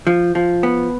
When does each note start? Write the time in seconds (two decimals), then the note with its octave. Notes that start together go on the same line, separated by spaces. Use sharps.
0.07 F3
0.35 F3
0.63 B3